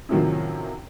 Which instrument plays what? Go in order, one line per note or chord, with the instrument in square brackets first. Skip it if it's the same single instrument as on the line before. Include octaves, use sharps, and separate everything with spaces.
[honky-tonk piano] F#2 A2 C3 D#3 F3 F#3